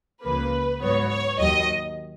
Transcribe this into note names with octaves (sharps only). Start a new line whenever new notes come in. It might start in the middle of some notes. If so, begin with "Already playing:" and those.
C#2 C#3 F3 A#3 B4
G#2 F#3 B3 C#5
C#5
D#2 D#3 F#3 D#5